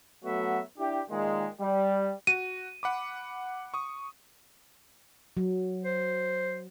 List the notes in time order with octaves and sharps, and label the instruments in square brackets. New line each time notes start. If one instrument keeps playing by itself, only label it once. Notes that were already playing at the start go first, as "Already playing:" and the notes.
[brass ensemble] F#3 A3 B3 F#4 E5
D4 E4 G4
A#2 D#3 G#3
G3
[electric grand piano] F#4 [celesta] D#7
[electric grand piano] F#5 B5 D6
C#6 D#6
[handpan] F#3
[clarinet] C5